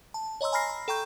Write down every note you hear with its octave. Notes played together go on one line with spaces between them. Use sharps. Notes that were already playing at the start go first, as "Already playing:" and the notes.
A5
C#5 D#5 A#5 C6 E6
G#5 A#5 B5 F6 A#6 C7
B5
A4 G5 A#5 C#6 G6